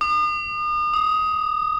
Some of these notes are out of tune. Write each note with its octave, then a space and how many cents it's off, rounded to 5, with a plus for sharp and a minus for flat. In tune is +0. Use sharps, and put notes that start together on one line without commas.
D#6 -40
D#6 +15